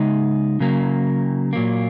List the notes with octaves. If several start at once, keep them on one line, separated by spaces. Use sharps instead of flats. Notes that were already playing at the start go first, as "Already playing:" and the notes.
Already playing: C#3 G#3 D#4
C#3 F#3 A#3
A#2 F#3 A#3